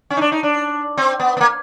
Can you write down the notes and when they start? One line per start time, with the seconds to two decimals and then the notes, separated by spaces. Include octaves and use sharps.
0.10 C#4
0.17 D#4
0.21 D4
0.32 D#4
0.43 D4
0.97 C4
1.20 B3
1.37 B3
1.41 A#3